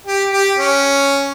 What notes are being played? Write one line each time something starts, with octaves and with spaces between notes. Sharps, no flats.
G4
G4
C#4